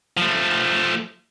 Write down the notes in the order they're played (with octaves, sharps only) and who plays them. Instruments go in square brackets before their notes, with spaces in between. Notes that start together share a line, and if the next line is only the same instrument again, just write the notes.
[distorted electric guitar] F3 A3